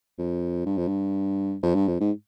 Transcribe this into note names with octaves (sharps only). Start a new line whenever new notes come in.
F2
G2
F2
G2
F2
G2
F2
G#2